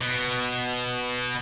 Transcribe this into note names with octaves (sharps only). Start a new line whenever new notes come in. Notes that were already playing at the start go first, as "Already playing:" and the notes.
B2